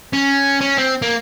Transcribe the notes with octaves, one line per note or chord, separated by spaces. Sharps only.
C#4
C#4
C4
A#3